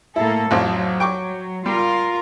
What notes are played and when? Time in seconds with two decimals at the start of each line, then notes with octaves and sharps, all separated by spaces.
0.16 A2 A#3 E4 A4
0.51 A1 F2 F#3
1.00 G5 C#6 D6
1.66 G3 F4 A#4